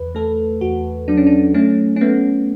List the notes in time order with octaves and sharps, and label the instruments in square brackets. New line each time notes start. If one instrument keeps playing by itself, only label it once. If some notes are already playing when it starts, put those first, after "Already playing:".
Already playing: [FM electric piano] E2 B4
A3 A4
E2 F#4
F#3 D4
C#4
D4
A3 C#4
C#4
A3 B3